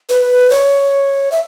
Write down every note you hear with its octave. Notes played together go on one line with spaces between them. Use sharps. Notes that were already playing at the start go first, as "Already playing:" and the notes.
B4
C#5
E5